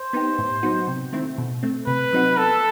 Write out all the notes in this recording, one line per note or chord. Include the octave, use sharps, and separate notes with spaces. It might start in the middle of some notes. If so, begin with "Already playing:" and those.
Already playing: C5
B3 D#4 G4
A2
F#3 B3 D#4 F#4
C3
D#3 A3 C4 E4
B2
A3 C4
C3 B4
F#3 C4 D#4 F#4
B3 A4